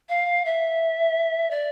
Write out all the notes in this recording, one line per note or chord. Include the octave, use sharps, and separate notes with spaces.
F5
E5
D5